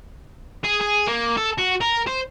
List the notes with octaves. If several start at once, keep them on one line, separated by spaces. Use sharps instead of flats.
G#4
G#4
A#3
A4
F#4
A#4
C5